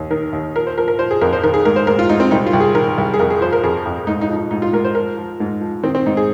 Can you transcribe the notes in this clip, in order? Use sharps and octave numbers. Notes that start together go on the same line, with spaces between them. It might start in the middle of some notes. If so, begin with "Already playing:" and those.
Already playing: D#2
D#3 A#4
D#2
F3 A#4
C5
F3 A#4
A#4
F3 C5
G#4
F2 A#4
C5
D#3 A#4
G#4
G#2 A#4
C5
G#2 A#4
F4
G#2 D#4
C4
C2 D#4
F4
C2
G#4
D#3 A#4
C2
G#4
F2 A#4
G#4
F3 C5
A#4
F2 G#4
F2
G#2 D#4
D#4
F3
D#4
G#2 D#4
F4
G#2 A#4
C5
F3 A#4
F3
G#2
F3
D#3 C4
C4
G#2 D#4
G#4